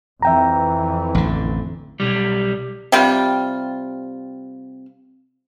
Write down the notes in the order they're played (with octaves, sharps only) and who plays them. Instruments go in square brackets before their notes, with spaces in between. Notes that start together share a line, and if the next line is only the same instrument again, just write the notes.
[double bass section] F2 E3 [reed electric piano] E5 G5 A#5
[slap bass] A1 D3
[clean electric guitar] B1 G3
[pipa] C3 G3 F4